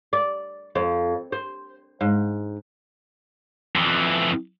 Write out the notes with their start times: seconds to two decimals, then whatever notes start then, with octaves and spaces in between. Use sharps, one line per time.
0.13 D5
0.75 F2
1.32 C5
2.01 G#2
3.76 F2 E3